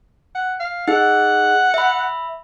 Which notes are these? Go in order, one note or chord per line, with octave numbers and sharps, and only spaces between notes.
F#5
F5
D#4 G#4 F#5
E5 B5